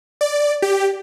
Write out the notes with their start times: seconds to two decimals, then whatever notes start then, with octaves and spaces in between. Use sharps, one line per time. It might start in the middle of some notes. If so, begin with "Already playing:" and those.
0.21 D5
0.62 G4